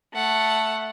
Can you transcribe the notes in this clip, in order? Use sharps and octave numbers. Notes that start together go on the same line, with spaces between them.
A3 F#5